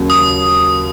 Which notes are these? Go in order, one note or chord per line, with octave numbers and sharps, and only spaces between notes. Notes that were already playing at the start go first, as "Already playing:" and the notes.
Already playing: D#2 C#3 F#3 C#4
D#6